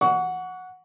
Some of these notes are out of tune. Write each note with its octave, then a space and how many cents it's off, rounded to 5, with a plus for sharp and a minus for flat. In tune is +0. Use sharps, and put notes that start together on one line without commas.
F#5 -10 C#6 +30